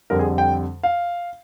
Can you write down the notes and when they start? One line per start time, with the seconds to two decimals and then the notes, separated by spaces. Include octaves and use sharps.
0.10 F2 D3 G3 A#4
0.19 G#4
0.38 G5
0.83 F5